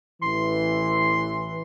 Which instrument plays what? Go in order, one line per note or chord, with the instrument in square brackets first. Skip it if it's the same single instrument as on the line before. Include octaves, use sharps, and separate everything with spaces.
[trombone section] A1 E3 [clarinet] C6